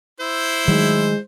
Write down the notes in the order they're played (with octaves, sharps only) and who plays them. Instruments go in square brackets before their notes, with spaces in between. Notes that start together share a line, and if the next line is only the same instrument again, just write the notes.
[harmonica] E4 C5
[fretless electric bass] D#3 F#3 A3 [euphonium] G#3